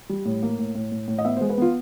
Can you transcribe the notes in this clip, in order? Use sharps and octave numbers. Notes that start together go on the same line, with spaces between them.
G3
A2
A#3
A2
A2
A2
A2
D#5
B3 E5
G#3 C5
B4
B3 F4